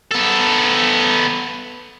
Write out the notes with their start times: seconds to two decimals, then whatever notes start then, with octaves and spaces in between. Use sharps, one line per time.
0.11 B3 A4